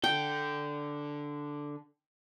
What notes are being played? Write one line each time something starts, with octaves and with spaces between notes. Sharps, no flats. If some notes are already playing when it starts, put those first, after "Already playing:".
D3 A4 G5